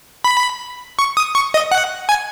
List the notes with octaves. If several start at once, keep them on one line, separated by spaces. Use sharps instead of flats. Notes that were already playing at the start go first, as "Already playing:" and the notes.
B5
C#6
D#6
C#6
D#5
F#5
G#5